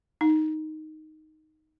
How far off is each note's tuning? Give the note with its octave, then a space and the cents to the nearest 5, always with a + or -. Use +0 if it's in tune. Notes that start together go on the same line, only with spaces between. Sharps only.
D#4 +0